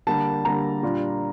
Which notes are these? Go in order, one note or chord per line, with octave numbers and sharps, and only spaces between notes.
D3 G3 A#3 A5
D3 G3 A#3 A#5
A#2 G3 D4 F4